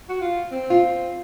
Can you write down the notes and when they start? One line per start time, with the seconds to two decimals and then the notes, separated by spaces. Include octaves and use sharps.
0.09 F#4
0.21 F4
0.52 C4
0.70 F4